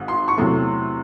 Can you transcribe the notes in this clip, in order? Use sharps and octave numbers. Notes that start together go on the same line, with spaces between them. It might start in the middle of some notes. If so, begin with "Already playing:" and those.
Already playing: G#1 G#2 D#3
C6
C#6
E2 C3 F#3 A3 C6